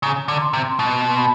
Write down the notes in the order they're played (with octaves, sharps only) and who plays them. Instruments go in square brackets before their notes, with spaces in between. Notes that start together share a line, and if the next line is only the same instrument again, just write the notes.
[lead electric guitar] C#3 [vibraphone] A#5
[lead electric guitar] D3
[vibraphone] C6
[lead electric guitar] C3
[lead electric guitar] B2 [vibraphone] C6
[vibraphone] B5